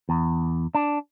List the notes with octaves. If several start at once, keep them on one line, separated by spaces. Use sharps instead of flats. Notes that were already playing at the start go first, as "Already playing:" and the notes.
E2
D4